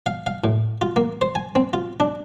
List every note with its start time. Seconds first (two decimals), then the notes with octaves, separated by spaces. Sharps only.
0.06 F5
0.26 F5
0.44 A2
0.81 F4
0.96 A#3
1.21 C5
1.35 G#5
1.55 C4
1.73 F4
2.00 D4